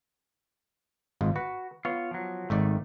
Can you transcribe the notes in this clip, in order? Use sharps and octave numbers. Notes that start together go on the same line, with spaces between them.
G#1 G#2 F4
F#4 B4
B3 F4 C#5
F3 F#3
G#1 G#2 D#3 A3 D5